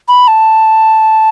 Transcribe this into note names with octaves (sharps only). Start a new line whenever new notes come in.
B5
A5